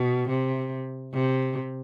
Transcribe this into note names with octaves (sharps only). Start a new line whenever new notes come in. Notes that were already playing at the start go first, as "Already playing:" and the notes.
Already playing: B2
C3
C3